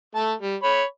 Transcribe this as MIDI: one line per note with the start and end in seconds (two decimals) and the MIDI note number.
0.15 0.33 57
0.15 0.33 81
0.41 0.56 55
0.63 0.83 73
0.63 0.83 83